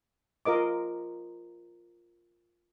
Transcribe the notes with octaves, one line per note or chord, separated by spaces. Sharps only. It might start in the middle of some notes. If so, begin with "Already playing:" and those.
F4 A#4 D#5 D6